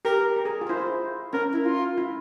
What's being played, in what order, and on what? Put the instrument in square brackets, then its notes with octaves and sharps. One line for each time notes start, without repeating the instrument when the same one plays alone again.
[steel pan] G4 [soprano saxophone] A#4
[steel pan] A#4
G#4
F4
[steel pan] E4 [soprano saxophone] C5
[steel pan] F4
[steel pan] C#4 [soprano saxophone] A#4
[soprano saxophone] E4
F4
[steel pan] E4